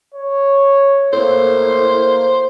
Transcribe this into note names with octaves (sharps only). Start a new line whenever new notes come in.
C#5
A2 A#3 C5